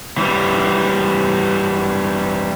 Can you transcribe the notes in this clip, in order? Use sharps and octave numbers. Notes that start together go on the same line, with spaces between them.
E3 G3